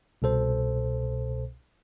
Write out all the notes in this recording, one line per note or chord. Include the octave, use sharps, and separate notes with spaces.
C2 B2 A4 C5